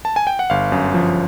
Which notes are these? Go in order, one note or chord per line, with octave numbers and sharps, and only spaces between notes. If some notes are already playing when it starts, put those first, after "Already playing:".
A5
G#5
G5
F#5
G1 F5
F#2
F3